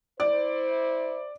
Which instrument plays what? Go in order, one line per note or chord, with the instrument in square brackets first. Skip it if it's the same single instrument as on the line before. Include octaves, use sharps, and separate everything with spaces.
[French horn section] E4 C5 [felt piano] D5